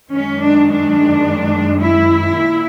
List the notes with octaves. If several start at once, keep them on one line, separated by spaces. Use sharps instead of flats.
F#2 D#3 G#3 C#4
D4
D4
E4
A#2